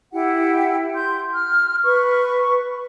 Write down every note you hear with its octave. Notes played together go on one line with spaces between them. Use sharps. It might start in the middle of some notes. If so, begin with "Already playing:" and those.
E4 G4 F#5 G5
C6 G6
F6
B4 C#6